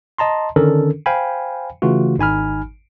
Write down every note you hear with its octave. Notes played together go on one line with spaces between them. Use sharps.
D#5 A5 A#5 C6
D3 D#3 C#4 D4 A4 A#4
C5 F5 G5 G#5 B5
C#3 E3 A3 F4 F#4
G#1 D#4 G#5 B5 F6